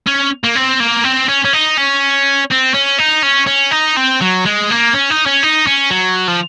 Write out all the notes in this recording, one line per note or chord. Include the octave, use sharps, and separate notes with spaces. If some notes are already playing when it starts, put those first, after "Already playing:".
C#4
A#3
C4
A#3
C4
C#4
C#4
D#4
C#4
C4
C#4
D#4
C#4
C#4
D#4
C4
F#3
G#3
A#3
C#4
D#4
C#4
D#4
C#4
F#3
F3